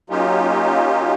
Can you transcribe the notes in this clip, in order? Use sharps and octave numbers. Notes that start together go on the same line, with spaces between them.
F#3 A#3 C#4 D#4 F4 G4